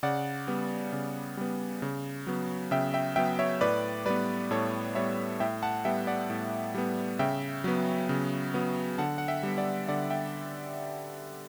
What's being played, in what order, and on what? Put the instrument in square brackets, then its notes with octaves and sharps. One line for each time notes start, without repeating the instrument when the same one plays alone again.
[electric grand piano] C#3 D5 F#5
G3 B3
C#3
G3 B3
C#3
F#3 B3
C#3 E5 G5
E5 G5
F#3 B3 E5 G5
C#5 E5
A2 B4 D5
G3 B3 B4 D5
A2 A4 C#5
G3 B3 C#5 E5
A2 E5 G5
F#5 A5
G3 B3 E5 G5
D5 F#5
A2
G3 B3
C#3 E5 G5
F#3 B3
C#3
F#3 B3
D3 F#5 A5
F#5
E5 G5
G3 B3
D5 F#5
D3 D5 F#5
E5 G5